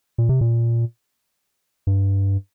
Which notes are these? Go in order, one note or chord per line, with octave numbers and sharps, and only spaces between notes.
A#2
C3
A#2
G2